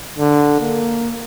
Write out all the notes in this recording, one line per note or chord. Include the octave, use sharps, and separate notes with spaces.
D3
A#3